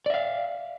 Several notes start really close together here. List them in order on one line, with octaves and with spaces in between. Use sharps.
D5 E5 F5